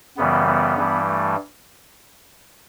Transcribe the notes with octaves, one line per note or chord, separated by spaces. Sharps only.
F#2 C#3 E3 G3 B3
B3
G2 E3 G3
A3